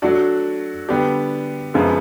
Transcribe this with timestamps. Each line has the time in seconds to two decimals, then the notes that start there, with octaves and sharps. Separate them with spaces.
0.02 F#3 A3 D4 F#4
0.88 D3 G3 B3 D4 G4
1.74 F#2 C#3 F3 G#3 B3